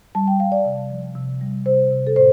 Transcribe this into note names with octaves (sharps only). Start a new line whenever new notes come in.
G3 A5
G5
G3 F5
D5
C3
F3
C3
G3
C3 C5
C3
A4
A2 C5